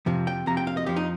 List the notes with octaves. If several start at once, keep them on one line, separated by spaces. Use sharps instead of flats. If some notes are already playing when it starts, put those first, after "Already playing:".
F2 C3 F3
G5
F2 C3 F3 A#5
G5
F5
D#5
F2 F3 G4
D#4